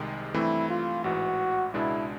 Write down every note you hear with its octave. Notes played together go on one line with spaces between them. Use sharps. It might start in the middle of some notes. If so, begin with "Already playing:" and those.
Already playing: C2 C3 D#3 G#3
G2 E3 A3 C4 E4
F4
A1 G#2 E3 F#4
C#2 B2 G#3 B3 D4 E4